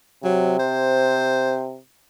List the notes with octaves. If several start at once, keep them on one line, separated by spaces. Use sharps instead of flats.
C3 F#3
C5